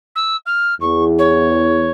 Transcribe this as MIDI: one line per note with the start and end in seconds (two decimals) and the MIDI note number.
0.15 0.36 88
0.46 0.74 89
0.81 1.92 40
0.81 1.04 85
1.18 1.91 73